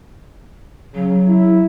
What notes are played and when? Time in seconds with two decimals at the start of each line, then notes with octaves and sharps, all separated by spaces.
0.95 C#3 F#3
1.28 E4